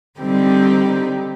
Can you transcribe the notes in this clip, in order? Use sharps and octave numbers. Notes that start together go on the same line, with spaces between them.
D3 G3 C4 D#4 G4